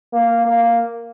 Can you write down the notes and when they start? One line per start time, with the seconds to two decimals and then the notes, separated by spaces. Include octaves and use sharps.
0.13 A#3
0.45 A#3